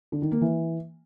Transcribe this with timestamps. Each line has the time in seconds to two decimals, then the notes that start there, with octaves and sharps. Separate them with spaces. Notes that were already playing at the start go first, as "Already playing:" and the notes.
0.12 D3
0.22 D#3
0.32 A#3
0.41 E3